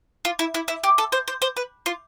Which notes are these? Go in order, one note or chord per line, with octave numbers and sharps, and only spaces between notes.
F4
E4
E4
E4
G4
A4
C5
C5
C5
B4
F4